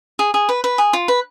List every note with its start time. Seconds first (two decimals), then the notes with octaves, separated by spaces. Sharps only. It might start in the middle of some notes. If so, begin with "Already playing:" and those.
0.19 G#4
0.34 G#4
0.49 B4
0.64 B4
0.78 G#4
0.93 F4
1.08 B4